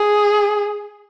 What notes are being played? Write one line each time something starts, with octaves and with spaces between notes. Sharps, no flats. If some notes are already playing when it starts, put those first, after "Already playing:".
Already playing: G#4